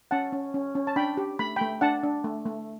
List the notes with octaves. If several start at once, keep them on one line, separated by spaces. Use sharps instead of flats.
C#4 F#5 A5
C#4
C#4
C#4
A5
D4 G5 B5
G4
A3 B5
G5 B5
A3
D4 F#5 A5
D4
A3
A3